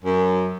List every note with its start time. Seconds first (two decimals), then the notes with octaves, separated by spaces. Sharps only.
0.03 F#2